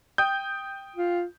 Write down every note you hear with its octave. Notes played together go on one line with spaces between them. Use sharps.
G5 D#6 G6
F4